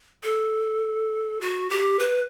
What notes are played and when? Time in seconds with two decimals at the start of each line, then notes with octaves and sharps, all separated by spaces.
0.23 A4
1.41 F#4
1.70 G4
1.99 B4